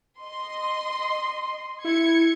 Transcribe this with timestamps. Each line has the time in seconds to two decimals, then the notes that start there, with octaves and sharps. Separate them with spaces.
0.22 D#5 C6
1.84 E4 G#6 C#7